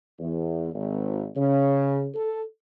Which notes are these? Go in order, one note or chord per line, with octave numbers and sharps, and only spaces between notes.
E2
G#1
C#3
A4